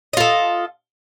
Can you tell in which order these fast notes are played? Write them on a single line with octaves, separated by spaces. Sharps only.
D#5 F4 A4